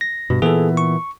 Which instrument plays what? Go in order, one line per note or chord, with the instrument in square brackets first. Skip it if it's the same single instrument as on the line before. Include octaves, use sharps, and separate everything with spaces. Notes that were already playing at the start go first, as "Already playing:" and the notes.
[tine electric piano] A#6
[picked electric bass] G2 B2
[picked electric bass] A#2 E3 B3 [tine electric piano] G#4 A4
[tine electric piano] C#6